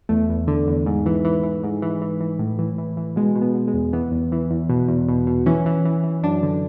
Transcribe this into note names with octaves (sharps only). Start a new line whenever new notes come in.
E2 A3
E2
D3
E2
G#2
E3
E3
E3
G#2
E3
E3
E3
A2
E3
E3
E3
B2 G#3
B2
B3
B2
G#3
E2
E3 B3
E2
E3
E2
B2
E2
B2
B2
E3 C#4
E3
E3
E3
F#2 D4
D3